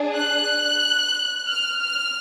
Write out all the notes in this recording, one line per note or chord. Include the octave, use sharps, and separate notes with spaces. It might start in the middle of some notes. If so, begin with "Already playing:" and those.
Already playing: D4 G#4
F#6
F6
F6